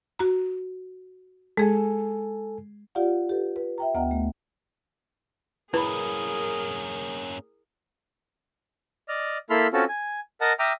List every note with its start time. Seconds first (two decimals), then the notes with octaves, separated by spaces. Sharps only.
0.19 F#4 A#5
1.57 G#3 G#4 A4 G#5
2.95 F4 G4 D5 F5 F#5
3.29 G4 A4 B4
3.56 B4
3.78 E5 G5 A#5
3.95 D2 B3 D#5 F#5 G5 A#5
4.11 A3
5.74 A#3 C#4 E4 G#4 A#4 B4 B5
9.09 D5 D#5 F6
9.50 A#3 E4 A4 B5 C6 F6
9.73 C4 C#4 F4 F#4 A4
9.89 G#5
10.41 A#4 D#5 F#5 A5
10.59 E5 G5 A#5 D6 D#6 F6